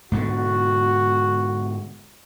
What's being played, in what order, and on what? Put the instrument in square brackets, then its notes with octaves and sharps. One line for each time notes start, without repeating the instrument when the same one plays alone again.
[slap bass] G#2 B2 D3 [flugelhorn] F#4